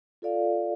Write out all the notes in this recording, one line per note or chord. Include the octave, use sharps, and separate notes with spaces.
F4 A4 D5 F5